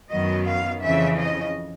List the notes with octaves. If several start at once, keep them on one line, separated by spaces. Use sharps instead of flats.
F#2 D#3 F#3 B3 D#5
F5
F2 C#3 E3 E5
D#5